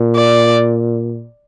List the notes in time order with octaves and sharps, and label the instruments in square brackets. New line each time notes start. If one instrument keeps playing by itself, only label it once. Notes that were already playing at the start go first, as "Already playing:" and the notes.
Already playing: [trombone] A#2
[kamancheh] D5